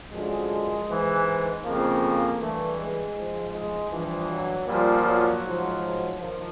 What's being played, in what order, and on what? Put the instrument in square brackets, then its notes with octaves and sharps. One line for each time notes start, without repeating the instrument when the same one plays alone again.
[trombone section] F#2 D3 F3 G#3
G#2 E3
F2 C#3 F3 A#3
G2 E3 A3
G#3
G#2 F3
G#3
G2 E3 F3
F#3
A#2 F3 G3
F#3
G#2 F3
F#3
D#3 F3